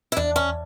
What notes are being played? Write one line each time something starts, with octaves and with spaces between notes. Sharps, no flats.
E4
E2 D4
C#4